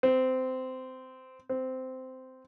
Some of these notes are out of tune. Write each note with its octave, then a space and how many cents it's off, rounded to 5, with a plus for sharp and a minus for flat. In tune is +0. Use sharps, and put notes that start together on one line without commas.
C4 -20
C4 -15